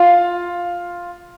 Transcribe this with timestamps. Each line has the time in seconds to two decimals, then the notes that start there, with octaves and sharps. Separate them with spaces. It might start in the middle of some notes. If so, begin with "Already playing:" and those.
Already playing: F4 F5